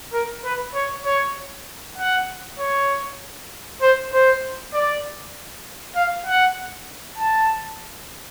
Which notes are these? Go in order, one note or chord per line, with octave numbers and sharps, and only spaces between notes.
A#4
B4
C#5
C#5
F#5
C#5
C5
C5
D5
F5
F#5
A5